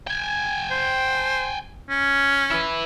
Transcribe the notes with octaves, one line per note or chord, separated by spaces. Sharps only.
G5 G#5
C5
C#4
E4 B4